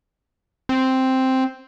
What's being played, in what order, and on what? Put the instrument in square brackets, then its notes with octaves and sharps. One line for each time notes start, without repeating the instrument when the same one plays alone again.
[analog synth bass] C4